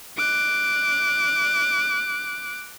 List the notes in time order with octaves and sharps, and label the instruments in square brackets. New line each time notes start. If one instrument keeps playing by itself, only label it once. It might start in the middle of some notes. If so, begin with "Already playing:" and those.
[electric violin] D6 F#6